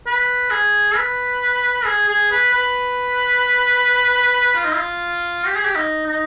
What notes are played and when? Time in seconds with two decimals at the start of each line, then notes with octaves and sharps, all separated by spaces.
0.06 B4
0.50 G#4
0.95 B4
1.85 G#4
2.08 G#4
2.31 B4
2.53 B4
4.55 F4
4.65 D#4
4.75 F4
5.46 G4
5.56 G#4
5.65 G4
5.75 D#4
6.06 D#4